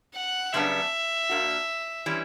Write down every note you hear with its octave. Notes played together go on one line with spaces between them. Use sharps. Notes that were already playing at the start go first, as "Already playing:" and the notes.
F#5
F#2 C#3 G3 B3 D4 E5
A#2 A#3 D4 F#4
E3 G3 C#4